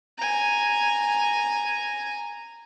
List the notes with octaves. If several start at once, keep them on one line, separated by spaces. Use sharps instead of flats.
G#5 A#5